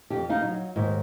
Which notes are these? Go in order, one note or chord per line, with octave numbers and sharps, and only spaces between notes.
F2 G4
D#4 F5
F#3
D#2 G#2